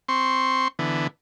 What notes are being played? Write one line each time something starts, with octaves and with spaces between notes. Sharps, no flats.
C4 C6 C#6
D3 E3 B3